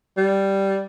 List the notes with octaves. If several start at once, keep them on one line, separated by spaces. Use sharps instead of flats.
G3